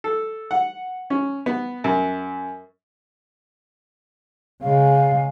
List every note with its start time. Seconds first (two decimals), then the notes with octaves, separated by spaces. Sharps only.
0.04 A4
0.51 F#5
1.10 C#4
1.46 B3
1.84 F#2
4.62 C#3 G#3 F5